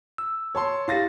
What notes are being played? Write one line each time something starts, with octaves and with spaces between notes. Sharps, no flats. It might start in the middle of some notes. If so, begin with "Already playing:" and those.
E6
C#5 A5 C6
E4 G4 F5 A6 A#6